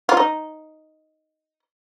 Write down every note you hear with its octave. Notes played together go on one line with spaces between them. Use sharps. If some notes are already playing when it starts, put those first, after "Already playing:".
F4
D#4